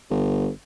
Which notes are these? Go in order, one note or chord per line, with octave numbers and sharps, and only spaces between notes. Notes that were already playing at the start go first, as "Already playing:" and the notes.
G1